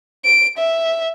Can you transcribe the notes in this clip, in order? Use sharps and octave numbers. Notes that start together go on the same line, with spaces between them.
D7
E5